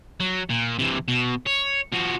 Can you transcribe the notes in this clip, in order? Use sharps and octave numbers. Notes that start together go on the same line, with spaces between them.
F#3
A#2
C3 E3
B2
C#5
F3 F#4